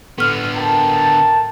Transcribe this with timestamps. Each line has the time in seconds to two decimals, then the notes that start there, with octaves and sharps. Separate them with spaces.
0.18 A2 D3 B3 F6
0.55 A#4 G5 A5